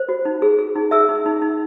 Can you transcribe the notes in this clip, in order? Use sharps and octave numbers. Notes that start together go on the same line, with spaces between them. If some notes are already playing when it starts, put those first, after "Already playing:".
Already playing: C5
F#4
D#4
G#4
G#4
D#4
G#4 E5 E6
D#4
D#4
D#4